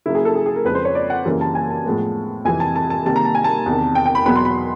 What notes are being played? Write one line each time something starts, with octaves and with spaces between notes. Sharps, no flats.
C#3 F#3 A#3 E4
G#4
A4
G#4
G#4
A#4
F2 C#3 F3 G#3 B4
C5
C#5
D5
F#5
F#2 C#3 E3 G3 A#3
A5
G#5
A5
A2 F3 G#3 B3
F2 C3 E3 G3 G#5
A5
A5
A5
C3 D#3 G3 A#3 A5
A#5
A5
G#5
A5
E2 C3 D#3
G5
G5
B5
E2 B2 F#3 B3 B5
C6
B5